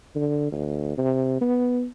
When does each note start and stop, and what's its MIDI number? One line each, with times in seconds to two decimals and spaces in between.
0.16 0.49 50
0.52 0.94 38
0.98 1.38 48
1.41 1.86 59